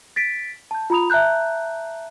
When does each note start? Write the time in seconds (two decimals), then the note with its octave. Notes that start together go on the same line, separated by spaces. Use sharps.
0.16 A6 B6 D7
0.71 A5 G6
0.90 F4 A#5 B5 D#6 F7
1.10 E5 A5 A#5 F#6 G6